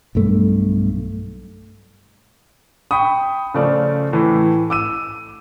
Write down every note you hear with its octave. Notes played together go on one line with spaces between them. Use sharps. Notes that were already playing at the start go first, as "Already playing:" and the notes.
B1 G2 A3
G5 B5 C#6 D#6
C#3 F3 A3 D5
A2 E3
D6 E6 D#7